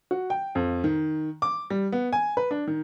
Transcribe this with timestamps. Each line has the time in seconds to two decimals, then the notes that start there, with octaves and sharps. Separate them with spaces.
0.11 F#4
0.30 G5
0.55 F2
0.84 D#3
1.42 D6
1.70 G3
1.92 B3
2.13 G#5
2.37 B4
2.51 D4
2.67 D#3